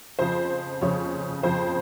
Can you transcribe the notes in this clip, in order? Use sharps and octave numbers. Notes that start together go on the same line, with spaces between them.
F2 C#3 F3 C5
F2 C#3 F3 C#5
F2 C#3 F3 C5